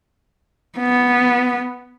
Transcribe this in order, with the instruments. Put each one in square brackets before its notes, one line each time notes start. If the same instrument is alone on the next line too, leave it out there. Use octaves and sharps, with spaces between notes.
[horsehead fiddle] B3